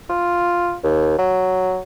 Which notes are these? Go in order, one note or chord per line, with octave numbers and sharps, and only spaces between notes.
F4
D#2
F#3